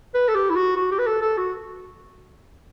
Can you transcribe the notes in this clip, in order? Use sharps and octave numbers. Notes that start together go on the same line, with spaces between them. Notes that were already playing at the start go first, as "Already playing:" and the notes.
B4
A4
G4
E4
F#4
F#4
G4
B4
A4
A4
F#4